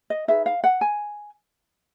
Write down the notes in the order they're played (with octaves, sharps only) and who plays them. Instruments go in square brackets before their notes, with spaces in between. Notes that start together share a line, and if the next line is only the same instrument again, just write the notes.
[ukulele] D#5
D#4 G#4 B4 E5
F5
F#5
G#5